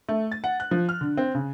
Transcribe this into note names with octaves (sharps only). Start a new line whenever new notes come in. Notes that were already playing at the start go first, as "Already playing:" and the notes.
A3
A6
F#5
F#6
F3
F6
D3
C4
C#3